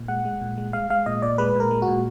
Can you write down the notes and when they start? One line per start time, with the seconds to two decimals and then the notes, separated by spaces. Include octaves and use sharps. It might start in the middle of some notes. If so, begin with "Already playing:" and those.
Already playing: A#2
0.08 G#3 F#5
0.25 G#3
0.41 A#2
0.58 G#3
0.73 G#3 F5
0.90 G#3 F5
1.06 A#2 D#5
1.22 A#2 D5
1.38 G#3 B4
1.56 A#2 A#4
1.71 G#3
1.82 F#4
1.88 A#2